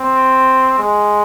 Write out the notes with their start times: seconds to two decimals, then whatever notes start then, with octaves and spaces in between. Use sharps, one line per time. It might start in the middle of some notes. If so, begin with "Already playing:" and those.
Already playing: C4
0.78 G#3